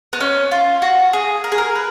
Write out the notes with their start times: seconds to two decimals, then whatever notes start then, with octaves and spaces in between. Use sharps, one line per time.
0.13 B3
0.21 C#4
0.51 F4
0.82 F#4
1.13 G#4
1.44 A#4
1.52 G#4
1.58 A#4
1.75 B4